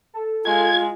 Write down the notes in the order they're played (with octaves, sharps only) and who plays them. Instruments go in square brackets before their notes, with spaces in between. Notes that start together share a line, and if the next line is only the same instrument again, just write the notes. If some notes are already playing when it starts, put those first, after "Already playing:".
[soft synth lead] A4
[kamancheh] G#3 [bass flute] F4 [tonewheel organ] G#6